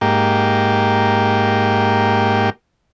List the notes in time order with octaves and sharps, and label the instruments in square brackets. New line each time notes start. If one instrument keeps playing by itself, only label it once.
[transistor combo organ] G#2 A#3 G4